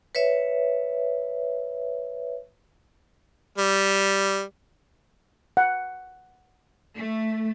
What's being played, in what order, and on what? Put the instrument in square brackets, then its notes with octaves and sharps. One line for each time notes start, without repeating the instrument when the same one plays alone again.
[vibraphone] B4 C#5 E5
[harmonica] G3
[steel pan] F#5
[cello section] A3